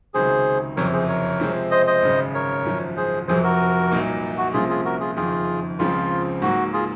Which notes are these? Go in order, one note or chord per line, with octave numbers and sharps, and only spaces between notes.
C#2 C3 D#3 F#3 G#4 C5
F#1 F2 C3 A#4 C#5
G#4 C5
A#4 C#5
C3 F3 G#3 C4
C5 D#5
C5 D#5
G#1 F#2 C#3
A#4 C#5
G#1 F#2 F3
G#4 C5
F1 F2 C3 F#3 G#4 C5
F#4 A#4
C2 A#2 F#3 A#3 D#4
F#4
C2 C3 F3 A#3 C#4 F4 G#4
F4 G#4
F#4 A#4
F4 G#4
F#1 F2 D#3 F4 G#4
C#2 C#3 F3 C4 F4
G#2 F#3 A#3 F#4
F4 G#4